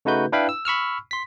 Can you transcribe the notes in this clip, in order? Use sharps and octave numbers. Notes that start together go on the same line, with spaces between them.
C#3 A3 D#4 F#4 B4 G6
D4 E4 B4 F5 G5 B5
E6
B5 C#6 E6 F6
C6 B6